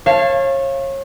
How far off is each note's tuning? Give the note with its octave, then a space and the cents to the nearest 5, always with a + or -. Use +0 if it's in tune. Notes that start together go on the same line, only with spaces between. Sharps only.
C#5 -30 F5 -25 A5 +0